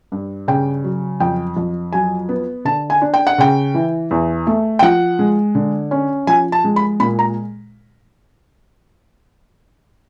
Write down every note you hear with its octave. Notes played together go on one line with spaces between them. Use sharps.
G2
C#3 G5
F#3
F2 G5
F2
F#3 G#5
B3
D3 A5
G#5
D4
G5
F#5
C#3 G5
E3
E2
A3
G5
F3 F#5
G#3
D3
C#4
F3 G#5
A5
G#3
B5
A#2 B5
A#5